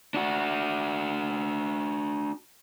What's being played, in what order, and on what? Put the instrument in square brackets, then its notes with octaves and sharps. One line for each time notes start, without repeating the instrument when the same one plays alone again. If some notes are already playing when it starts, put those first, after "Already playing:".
[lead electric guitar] D4 F#4